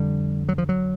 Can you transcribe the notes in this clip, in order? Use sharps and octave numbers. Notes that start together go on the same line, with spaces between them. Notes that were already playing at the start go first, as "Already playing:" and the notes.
Already playing: F2 D3 G3
F#3
F3
F#3